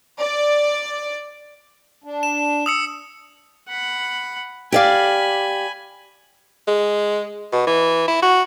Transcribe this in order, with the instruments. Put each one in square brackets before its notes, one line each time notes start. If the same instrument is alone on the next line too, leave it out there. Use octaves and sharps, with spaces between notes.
[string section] D5
[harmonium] D4
[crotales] E7
D#6 E6 C#7
[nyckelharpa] F#5 B5
[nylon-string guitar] G4 D5 F5 [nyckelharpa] G#5 B5
[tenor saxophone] G#3
B2
E3
E4
F#4